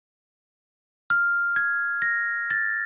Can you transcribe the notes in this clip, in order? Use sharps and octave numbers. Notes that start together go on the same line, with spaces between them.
F6
G#6
A#6
A6